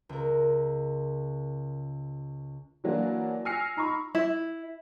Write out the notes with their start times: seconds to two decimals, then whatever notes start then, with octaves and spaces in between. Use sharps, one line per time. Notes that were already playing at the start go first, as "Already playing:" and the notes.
0.09 C#2 A#4
2.84 E3 F#3 A#3 D4 F#4 A#4
3.45 G#5 E6 F6 A#6 C7 C#7
3.77 D#4 A#5 B5 C#6
4.15 E4